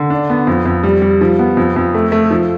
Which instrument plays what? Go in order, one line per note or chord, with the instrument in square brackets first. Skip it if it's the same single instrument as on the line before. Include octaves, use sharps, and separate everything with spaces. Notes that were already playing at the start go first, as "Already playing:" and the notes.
Already playing: [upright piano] D3
D4
B3
F2
F2
G3
G3
F3
B3
F2
F2
A3
A3
F3